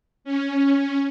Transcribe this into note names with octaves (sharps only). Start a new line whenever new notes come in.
C#4